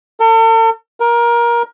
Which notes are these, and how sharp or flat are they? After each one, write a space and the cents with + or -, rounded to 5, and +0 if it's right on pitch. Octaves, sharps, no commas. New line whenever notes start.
A4 +45
A#4 +20